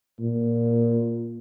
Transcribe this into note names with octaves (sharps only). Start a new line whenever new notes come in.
A#2